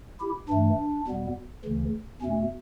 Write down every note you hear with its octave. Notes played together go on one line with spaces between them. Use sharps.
E4 G4
G2 E3 A3 D4
E2 B2 G3 B3
D2 C#3 E3
E2 B2 A3 C#4